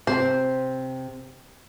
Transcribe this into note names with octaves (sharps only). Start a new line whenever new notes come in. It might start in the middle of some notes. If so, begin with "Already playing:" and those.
C3 C5